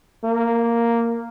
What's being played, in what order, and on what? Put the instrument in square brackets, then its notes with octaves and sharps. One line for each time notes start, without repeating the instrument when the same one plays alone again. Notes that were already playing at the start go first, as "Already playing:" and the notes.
[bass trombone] A#3